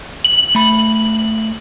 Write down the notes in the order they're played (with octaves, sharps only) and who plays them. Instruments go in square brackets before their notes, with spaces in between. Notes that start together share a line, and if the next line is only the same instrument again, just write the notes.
[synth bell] F#7
[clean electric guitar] A3 B5